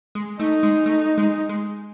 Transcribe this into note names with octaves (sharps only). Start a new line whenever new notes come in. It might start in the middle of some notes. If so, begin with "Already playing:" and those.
G#3
A3 D#4
G#3
A3
G#3
G#3